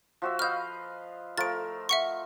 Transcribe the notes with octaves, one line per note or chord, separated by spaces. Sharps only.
F3 F#4 E5
B4 D#5 F5 F6 G6
F3 A3 A#4 A6 D7
E5 F#5 C#6